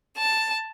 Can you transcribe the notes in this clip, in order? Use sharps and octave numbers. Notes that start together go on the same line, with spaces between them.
A5